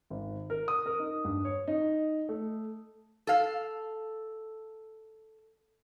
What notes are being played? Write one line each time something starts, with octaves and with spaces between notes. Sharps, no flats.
G#1
A#4
D#6
A#4
D#4
G2
C#5
D#4
A3
A4 F5